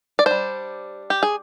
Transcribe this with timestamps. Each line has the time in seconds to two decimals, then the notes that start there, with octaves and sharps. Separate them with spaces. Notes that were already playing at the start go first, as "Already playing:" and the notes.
0.19 D5
0.26 G3 D4 C5
1.10 G4
1.23 G#4